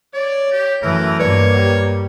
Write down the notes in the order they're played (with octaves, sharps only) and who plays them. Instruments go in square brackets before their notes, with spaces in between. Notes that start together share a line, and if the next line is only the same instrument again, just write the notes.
[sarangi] C#5 [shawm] D5
[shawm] G4
[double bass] F#2 E3 [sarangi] A3 [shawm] A#4
[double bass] G2 A#3 [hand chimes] B4 D5 [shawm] C#5
[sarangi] G3